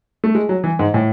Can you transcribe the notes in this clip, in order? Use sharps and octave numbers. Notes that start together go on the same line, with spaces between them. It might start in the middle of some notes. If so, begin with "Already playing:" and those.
A3
G#3
F#3
E3
G#2
A2